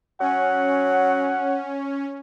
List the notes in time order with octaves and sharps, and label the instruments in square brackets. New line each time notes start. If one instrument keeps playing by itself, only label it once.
[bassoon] F#3 [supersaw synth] C#4 [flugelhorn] F#5